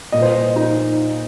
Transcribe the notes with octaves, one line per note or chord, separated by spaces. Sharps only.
A#2 D#5
C5
D#5
D#4